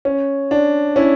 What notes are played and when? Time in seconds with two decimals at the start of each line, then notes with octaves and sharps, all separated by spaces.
0.05 C#4
0.51 D4
0.96 C#4 E4